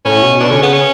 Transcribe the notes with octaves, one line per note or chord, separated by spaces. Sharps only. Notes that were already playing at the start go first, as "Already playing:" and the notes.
A2 C#4
B2
B2 D4
D3 C#4
C#3 B3
C#4